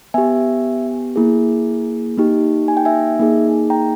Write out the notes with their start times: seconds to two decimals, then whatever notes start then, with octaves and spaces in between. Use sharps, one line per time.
0.14 B3 G4 E5 G#5
1.16 A#3 E4 G#4
2.17 A#3 D#4 G4
2.68 G#5
2.77 G5
2.85 E5 G#5
3.19 A#3 D#4 G#4
3.70 G5 A#5